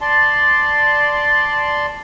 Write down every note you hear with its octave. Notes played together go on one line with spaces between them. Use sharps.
D5 A5 C6